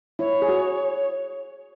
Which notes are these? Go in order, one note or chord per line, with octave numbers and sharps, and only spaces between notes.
E4 C#5
G#4
F#4